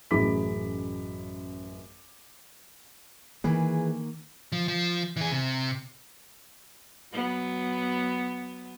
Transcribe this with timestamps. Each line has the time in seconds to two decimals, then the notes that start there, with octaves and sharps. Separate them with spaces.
0.11 A1 F#2 G#4 B5 D6 B6
3.44 D#3 E3 A#3 G#4 B4
4.52 F3
4.68 F3
5.17 E3 G#4
5.32 C3
7.13 F#3 B3